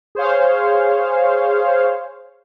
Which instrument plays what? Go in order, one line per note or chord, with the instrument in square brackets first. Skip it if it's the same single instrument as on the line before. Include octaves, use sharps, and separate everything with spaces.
[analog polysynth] G#4 C5 C#5 F5